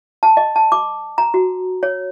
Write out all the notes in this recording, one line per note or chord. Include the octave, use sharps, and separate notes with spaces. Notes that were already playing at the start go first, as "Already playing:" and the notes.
A5
D#5
A5
D6
A#5
F#4
C#5